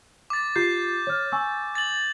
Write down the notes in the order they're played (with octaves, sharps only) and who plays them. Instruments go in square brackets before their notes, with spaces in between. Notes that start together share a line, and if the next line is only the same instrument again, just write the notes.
[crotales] D6 A6
[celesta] F4 G4 C7 [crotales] G6
[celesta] C#5 F6
G#5 C#6 E6
[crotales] A6 F#7